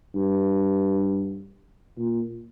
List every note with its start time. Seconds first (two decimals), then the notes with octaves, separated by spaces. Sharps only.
0.16 G2
1.98 A#2